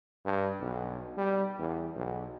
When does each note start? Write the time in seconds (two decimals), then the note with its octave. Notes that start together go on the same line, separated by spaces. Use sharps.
0.25 G2
0.60 B1
1.17 G3
1.59 E2
1.96 B1